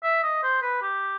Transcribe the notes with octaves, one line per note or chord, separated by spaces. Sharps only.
E5
D#5
C5
B4
G4